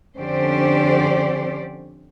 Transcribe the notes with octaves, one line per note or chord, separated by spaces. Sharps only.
F2 D3 C#4 G4 C5 D5